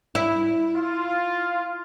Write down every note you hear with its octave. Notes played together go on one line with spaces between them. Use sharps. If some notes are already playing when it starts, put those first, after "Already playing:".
E4
F4